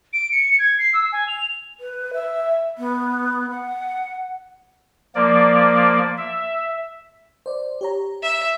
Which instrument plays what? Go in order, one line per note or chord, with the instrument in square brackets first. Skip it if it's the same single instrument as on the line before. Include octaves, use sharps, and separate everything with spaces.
[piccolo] D7
C#7
G#6
C7
E6
G#5
F7
[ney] B4
E5
B3
F#5
[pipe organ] F3 A#3 D5
E5
[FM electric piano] C5 D5
G4 C#5 A#5
[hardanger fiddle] E5